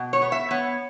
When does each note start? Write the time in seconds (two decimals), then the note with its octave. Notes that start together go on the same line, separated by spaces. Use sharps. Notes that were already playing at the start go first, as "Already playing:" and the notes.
Already playing: B2
0.13 C#5
0.22 B3
0.32 E5
0.51 B3 C#5